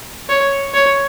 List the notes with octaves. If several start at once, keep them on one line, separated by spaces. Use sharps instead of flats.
C#5
C#5